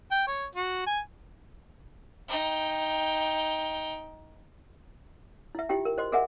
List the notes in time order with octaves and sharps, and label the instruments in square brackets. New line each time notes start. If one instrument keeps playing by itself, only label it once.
[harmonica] G5
C#5
F#4
G#5
[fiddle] D#4 G5
[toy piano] E4 E5
E4 F4 G4 G5
A#4
C5 D#5 C6
G#4 A#4 D#5 E5 F#5 G#5